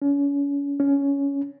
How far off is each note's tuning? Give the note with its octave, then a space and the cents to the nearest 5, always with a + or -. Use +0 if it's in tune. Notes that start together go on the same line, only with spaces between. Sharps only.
C#4 +35
C#4 +15